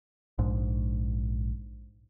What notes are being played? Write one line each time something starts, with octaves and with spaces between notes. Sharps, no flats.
A#1 G#2